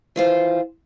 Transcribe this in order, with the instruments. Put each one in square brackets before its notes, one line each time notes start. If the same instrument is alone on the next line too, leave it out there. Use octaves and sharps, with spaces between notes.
[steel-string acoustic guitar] E3 F4 C5